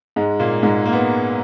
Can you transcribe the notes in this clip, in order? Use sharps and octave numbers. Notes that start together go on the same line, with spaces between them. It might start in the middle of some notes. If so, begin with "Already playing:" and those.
G#2 G#3
A#2 A#3
G#2 G#3
A#3
B3